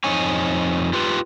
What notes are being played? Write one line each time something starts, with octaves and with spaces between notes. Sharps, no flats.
F2 D#4 C#5 G#5
F4 G4 B4